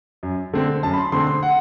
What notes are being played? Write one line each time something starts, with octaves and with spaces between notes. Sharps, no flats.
F#2
D3 A3 C4
F#2 A5
B5
C6
D3 A3 C4 C6
C6
F#5